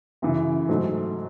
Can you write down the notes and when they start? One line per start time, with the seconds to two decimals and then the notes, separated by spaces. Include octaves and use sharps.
0.22 F#2 C#3 E3
0.69 G#2 F#3 A3